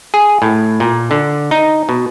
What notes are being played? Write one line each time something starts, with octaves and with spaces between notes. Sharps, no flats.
G#4
A2
A#2
D3
D#4
B2